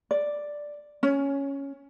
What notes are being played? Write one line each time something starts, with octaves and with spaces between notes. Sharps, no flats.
D5
C#4